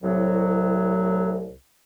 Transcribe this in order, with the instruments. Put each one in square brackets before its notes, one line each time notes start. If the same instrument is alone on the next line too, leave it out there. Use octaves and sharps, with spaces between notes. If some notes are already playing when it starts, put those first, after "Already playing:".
[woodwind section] C2 A2 F#3